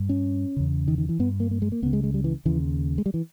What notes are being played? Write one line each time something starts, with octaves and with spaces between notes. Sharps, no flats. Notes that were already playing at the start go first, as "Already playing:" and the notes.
Already playing: G2
C#4
E2 C#3
D#3
D#3
E3
G2 B3
A#3
A#3
G#3
A#3
C#2 C#3 B3
G#3
G#3
G3
E3
D#2 C#3 E3
G#3
G3
E3